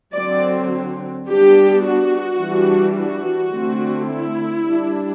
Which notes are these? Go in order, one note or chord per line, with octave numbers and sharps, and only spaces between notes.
D3 F#3 C4 D5
G3 B3 D4 G4
F#4
E3 G3 D4
F#4
D3 A3 C4
E4
G3 D4